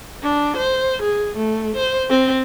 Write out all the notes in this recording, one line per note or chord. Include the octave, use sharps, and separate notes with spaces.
D4
C5
G#4
A3
C5
C4